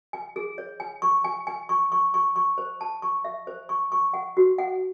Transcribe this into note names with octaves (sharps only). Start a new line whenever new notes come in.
G#5
G#4
C#5
G#5
C#6
G#5
G#5
C#6
C#6
C#6
C#6
C5
A5
C#6
E5
C5
C#6
C#6
F#5
F#4
F#5